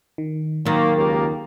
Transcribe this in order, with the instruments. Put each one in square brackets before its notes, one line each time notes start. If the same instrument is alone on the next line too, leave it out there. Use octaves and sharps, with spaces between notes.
[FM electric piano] D#3
[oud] D#2 D#3 [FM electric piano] F#3 A6 A#6 [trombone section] A#3
[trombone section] C#2 A#3 G4